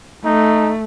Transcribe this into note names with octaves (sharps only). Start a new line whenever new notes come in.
A3 D#4